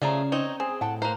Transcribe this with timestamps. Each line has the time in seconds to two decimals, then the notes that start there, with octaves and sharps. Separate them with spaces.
0.02 C#3 F3 A3 G#4 D5 A#5
0.32 C4 D#4 C#5
0.60 C4 G#4
0.81 A2 F#5 G5 A5
1.02 A#3 B4 C5 A#5